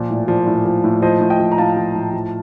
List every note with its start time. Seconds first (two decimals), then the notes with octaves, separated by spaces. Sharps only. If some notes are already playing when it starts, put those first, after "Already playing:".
Already playing: A#2 F3 D5
0.10 A2
0.28 F3
0.47 A2
0.65 F3
0.84 A2
1.02 F3 C5 D#5
1.21 A2
1.30 D#5 G5
1.40 F3
1.52 A#5
1.58 A2 F5 A5
1.77 F3
1.95 A2
2.13 F3